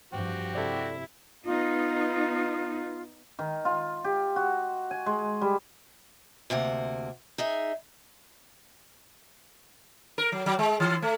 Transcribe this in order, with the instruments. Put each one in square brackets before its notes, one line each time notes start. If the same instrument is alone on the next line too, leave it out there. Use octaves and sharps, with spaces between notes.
[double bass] G2 F3 [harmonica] C4 F#4 G4
[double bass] C3 [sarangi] E4 [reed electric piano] A4 D5
[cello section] B3 D#4 [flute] F4
[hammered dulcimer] D#3
F4
G4
F#4
G#5
G#3
G3
[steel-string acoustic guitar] D2 C3 A#3 F#5
D#4 G#4 E5
[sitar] A#4
F#3
F#3
G#3
E3
A3